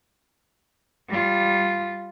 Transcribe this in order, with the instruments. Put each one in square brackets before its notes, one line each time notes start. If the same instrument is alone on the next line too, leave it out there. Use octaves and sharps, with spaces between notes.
[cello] G3 F4